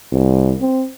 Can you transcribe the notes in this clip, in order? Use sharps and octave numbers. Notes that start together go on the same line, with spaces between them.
C2
C4